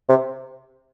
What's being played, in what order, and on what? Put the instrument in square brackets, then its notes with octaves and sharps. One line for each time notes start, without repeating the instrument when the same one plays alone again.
[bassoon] C3